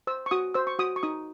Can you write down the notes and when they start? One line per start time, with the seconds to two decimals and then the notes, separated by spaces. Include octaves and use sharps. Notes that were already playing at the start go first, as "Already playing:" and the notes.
0.07 C5 E6
0.26 C#6
0.31 F#4 D#6
0.54 C5 E6
0.67 C#6
0.79 F#4 D#6
0.96 C#6
1.03 D#4 D#6